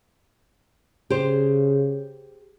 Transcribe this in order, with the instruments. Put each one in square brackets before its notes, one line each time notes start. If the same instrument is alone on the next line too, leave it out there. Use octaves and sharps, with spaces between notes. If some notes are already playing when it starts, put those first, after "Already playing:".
[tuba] C#3 [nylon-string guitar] G4 G#4 C5